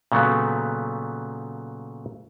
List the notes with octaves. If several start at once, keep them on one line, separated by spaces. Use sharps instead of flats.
A#2 C#3 F#3 A3 B3